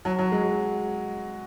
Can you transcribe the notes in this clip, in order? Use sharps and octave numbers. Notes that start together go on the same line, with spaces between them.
F#3
F#3
G#3